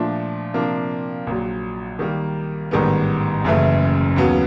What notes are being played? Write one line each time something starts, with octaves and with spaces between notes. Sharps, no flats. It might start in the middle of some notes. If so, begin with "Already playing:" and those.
Already playing: A#2 F3 A3 D4
C3 F3 A#3 D4
A#1 A#2 F#3
D#3 G3 A#3
A1 G#2 D#3 G3 B3
F#1 F#2 C#3 E3 A3
D#2 C#3 F#3 B3